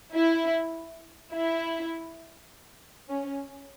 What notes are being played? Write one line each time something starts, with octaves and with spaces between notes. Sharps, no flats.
E4
E4
C#4